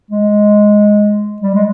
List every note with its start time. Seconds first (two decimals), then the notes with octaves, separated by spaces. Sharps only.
0.11 G#3
1.42 G3
1.55 G#3